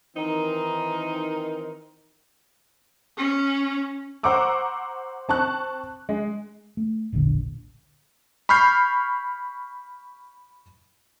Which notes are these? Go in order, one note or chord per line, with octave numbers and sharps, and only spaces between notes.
D#3 E3 C4 D#4 A#4
C#4
C5 F#5 A#5 C#6 D6 E6
C4 A5 C#6 F#6
G#3
A3
E1 A#1 B2 D3
B5 C#6 F6 G6 C7